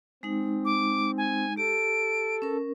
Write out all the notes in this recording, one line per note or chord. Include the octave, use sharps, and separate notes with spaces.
G#3 C4 D#4
D6
G#5
G4 A4 D7
C#4 A#4